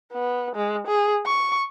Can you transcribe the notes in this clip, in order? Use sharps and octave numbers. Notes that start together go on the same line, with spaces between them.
B3
G#3
G#4
C#6